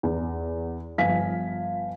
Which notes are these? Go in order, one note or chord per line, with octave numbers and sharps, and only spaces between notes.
E2
G1 F3 F5 G#5 B6